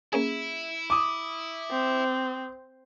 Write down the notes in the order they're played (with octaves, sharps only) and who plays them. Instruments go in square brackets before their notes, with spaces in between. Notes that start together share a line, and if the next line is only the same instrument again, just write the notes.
[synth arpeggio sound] A#3 C#4 G#4 [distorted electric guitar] E4
[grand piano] D6 D#6
[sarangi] C4